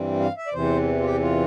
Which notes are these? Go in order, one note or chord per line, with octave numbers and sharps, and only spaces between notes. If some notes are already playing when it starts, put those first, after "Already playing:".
Already playing: G2 E3 G3 C4
F5
E5
D5
E2 C3 E3 C5
F4
G4
F4